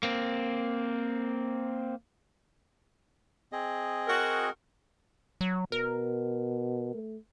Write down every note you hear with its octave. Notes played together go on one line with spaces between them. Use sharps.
A#3 C4
C4 G#4 D#5
F#4 A#4
F#3
B2 A#4
A3